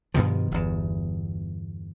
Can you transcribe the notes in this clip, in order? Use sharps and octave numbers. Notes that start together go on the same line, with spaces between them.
G2 B2 D#3 F3
G1 E2